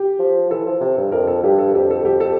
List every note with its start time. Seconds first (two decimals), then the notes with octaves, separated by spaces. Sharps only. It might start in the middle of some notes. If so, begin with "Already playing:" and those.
Already playing: G4
0.19 F3
0.50 E3 A4
0.66 F3
0.81 C3
0.98 G2
1.12 F2 A#4
1.27 A4
1.44 G2 G4
1.59 A4
1.75 F2 G4
1.91 A4
2.05 G4
2.20 A4